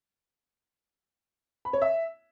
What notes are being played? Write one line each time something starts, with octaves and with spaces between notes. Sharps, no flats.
B5
C#5
E5